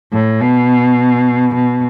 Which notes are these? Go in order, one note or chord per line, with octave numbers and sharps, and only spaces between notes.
A2
B2
B2